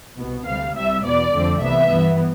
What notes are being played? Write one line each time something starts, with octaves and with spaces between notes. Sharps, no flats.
C2 B2 B3
D2 C3 G3 F5
C2 C3 G3 E5
E2 B2 B3 D5
F2 D3 F3 A3 C4
C2 C3 E3 B3 E5
G2 E3 B3